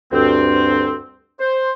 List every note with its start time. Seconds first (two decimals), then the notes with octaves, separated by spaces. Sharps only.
0.12 D2 G2 C4
1.39 C5